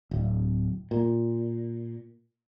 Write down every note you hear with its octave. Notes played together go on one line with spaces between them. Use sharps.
D1
A#2